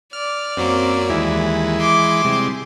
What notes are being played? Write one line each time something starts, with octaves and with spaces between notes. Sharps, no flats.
D5 F6
F#2 F#3 A#3 C4
D#2 E3 G#3 E4
C6 D6
C3 G3 G#3